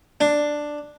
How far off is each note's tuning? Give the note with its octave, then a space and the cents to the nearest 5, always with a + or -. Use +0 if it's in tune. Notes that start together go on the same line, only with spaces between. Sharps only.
D4 +5